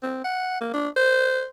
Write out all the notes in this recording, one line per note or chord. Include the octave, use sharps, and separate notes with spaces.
C4
F#5
A#3
D4
C5